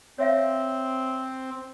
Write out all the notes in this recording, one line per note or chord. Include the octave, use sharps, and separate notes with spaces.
C4 C#5 E5 F5